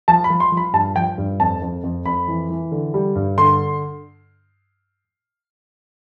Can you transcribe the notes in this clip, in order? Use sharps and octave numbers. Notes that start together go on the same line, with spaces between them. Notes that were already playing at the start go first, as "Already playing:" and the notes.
F3 A5
B5
F3
C6
F3
B5
G2 A5
F3 G5
G2
F2 A5
F2
F2
F2 B5
E3
E3
D3
G3
G2
D3 C6